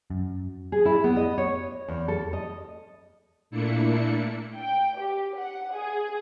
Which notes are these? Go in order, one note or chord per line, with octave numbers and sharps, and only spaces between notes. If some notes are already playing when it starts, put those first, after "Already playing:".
F#2
G#4
E4
B3
D#5
C#5
E2
A4
D#5
A#2 A3 A#3 D4 E4 C#7
G5
G4
F#5
G#4